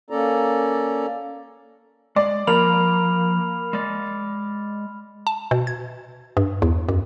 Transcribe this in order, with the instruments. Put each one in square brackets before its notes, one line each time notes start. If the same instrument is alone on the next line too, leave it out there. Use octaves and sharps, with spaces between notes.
[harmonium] A#3 C#4 A4 D5 A#5
[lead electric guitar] G#3 [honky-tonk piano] D5
[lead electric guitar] F3 [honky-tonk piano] A#3 A#4 [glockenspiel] B5 F6 F7
[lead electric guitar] G#3 D5
[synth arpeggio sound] A5
B2
G#6
G2
E2
F#2